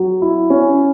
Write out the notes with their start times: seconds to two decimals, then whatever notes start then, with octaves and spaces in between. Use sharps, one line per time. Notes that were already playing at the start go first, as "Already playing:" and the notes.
Already playing: F#3
0.22 E4
0.50 C#4